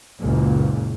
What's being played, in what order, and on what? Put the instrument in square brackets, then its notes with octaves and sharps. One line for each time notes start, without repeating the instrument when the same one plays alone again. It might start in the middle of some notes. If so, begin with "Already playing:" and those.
[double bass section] F#1 C#2 A#2